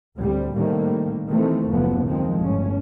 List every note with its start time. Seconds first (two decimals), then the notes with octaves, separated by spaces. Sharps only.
0.17 D2 A2 G3 C4
0.55 A2 C3 D#3 G3 A#3
1.30 C3 D#3 E3 A3 C4
1.70 F#1 D#2 F3 B3
2.05 D#3 F3 G#3 C4
2.38 G1 A2 C#4